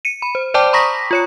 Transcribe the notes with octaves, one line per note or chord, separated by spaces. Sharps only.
C#7 D#7
B5
C5
C5 D5 G5 A5 D6
A#5 B5 C#6 D#6 A#6 B6
F4 C#5 C#7